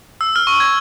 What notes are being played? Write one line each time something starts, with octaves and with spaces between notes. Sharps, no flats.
E6
F6
C#6
G#6